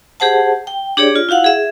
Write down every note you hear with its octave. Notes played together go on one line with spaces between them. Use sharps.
G4 G#4 C5 F#5 A5
G5
D4 G4 G#4 C#5 D5
F4
E4 F#4 F5 F#5
G#4 E5